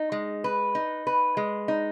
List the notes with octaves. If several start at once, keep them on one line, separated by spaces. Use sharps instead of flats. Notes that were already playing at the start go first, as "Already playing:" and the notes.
Already playing: D#4
G#3
B4
D#4
B4
G#3
D#4